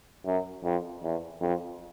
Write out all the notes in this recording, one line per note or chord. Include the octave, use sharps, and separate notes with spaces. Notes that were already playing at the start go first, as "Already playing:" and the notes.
F#2
F2
E2
F2